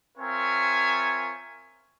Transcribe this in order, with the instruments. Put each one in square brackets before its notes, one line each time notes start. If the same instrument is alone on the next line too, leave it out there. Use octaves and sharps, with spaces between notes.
[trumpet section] C4 F4 A#4 C#5 E5 G#5